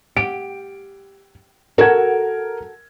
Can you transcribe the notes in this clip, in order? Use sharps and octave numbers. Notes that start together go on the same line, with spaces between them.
G4 D7
F#4 A4 A#4 G#6